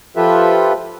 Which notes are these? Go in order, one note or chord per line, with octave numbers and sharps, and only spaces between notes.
F3 F4 G4 A4 B4 E5